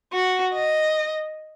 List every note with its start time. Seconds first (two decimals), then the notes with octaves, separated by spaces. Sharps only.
0.13 F#4
0.54 D#5